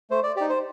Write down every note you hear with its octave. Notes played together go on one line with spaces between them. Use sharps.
A3 C5
D5
D#4 G4 D5
C5